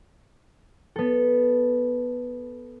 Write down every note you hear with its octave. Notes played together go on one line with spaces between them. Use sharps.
B3 A4